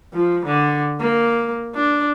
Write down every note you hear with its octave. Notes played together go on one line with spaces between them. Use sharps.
F3
D3
A#3
D4